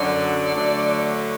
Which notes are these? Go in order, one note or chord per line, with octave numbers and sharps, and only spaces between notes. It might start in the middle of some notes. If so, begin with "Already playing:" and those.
Already playing: F#2 D3 F#3 D5
D2 D3 F#3 A3 D4